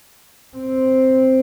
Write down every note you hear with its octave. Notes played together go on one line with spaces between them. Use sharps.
C4